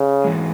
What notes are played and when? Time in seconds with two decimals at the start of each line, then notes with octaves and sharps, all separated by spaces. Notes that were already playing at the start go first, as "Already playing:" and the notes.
Already playing: C#3
0.24 G#2 E3 G#3